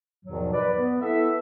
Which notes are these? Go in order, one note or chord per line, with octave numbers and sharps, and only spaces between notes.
E2 G#2 B2 D#3 F3 F#3
B4 D5
B3
E4 A4 B4 E5